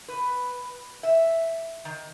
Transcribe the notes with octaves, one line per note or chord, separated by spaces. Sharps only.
B4
E5
D#3